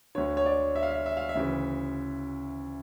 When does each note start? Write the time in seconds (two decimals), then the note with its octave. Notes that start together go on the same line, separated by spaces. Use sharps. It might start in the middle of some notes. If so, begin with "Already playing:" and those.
0.15 D2 D3 C#5
0.37 C#5
0.46 D5
0.75 E5
0.83 F5
0.90 E5
1.06 E5
1.17 F5
1.29 E5
1.35 D2 C#3 E3